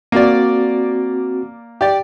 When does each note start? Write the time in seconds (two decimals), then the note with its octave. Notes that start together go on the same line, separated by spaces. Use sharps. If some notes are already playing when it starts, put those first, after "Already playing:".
0.12 A#3 C4 F#4 D5
1.81 G4 D5